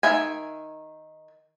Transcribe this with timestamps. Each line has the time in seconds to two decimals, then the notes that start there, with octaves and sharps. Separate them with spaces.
0.03 D#3 E5 G#5